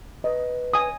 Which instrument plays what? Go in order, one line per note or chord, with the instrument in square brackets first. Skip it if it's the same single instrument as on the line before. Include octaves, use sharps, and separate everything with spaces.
[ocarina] B4 [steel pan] D#5
[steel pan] G#5 D#6